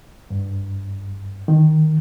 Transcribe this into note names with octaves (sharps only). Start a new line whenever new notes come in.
G2
D#3